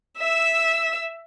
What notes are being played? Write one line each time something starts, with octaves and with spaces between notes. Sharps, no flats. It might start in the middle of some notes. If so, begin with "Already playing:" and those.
E5 E6